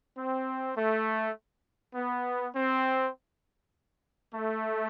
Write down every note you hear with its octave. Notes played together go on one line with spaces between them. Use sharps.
C4
A3
B3
C4
A3